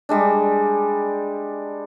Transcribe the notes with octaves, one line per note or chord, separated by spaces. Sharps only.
G3 G#3 D4